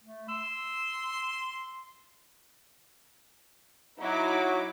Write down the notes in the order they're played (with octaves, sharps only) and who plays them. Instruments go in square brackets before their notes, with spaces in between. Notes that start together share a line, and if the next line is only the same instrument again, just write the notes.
[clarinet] A3
[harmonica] C6 [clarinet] E6
[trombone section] F#3 [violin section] D#4 E4 D6